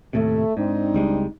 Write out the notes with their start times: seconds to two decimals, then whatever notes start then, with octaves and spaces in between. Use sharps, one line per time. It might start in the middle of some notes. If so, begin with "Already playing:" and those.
0.13 D#2 A2 C3 A3
0.57 G#2 C4 D4 D#4
0.94 C#2 G3 G#3